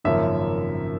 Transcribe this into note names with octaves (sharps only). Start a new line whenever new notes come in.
G#1 F#2 C#3 F3 A#3 E5